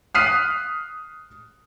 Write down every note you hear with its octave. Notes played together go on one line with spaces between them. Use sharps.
D#6 F6 F#6 B6 C7 D#7